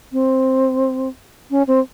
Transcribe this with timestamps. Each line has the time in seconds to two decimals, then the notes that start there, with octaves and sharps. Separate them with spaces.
0.13 C4
1.51 C#4
1.67 C4